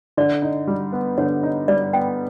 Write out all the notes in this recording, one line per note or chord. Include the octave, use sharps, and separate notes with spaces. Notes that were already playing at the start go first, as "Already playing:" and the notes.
D3 D5
D#4
G3
B3
D3 C#5
D#4
G3 D5
B3 G5